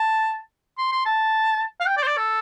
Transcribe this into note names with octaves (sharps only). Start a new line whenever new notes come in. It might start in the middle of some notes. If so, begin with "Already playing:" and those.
Already playing: A5
C6
C6
A5
F5
G5
D5
C5
D5
A4